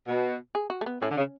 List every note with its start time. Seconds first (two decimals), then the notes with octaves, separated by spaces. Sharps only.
0.08 B2
0.55 G#4
0.70 F#4
0.81 A3
0.86 B3
1.02 A2 C#4
1.11 D3
1.18 C#3